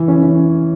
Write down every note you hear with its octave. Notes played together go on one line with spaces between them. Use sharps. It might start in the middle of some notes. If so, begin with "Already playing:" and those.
Already playing: E3
C#4
C#4